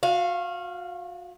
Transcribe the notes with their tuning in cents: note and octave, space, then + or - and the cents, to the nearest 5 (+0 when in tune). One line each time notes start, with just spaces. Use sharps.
F#4 -35 F5 -10